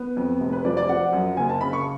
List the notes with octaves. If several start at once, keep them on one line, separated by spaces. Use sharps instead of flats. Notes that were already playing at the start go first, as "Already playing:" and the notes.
Already playing: B3
F2
F1
B4
F3 D5
D5
F3 F#5
F#2
F#1 G#5
A5
C#3 B5
C#6